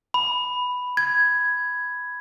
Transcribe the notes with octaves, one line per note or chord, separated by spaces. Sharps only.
B5
G#6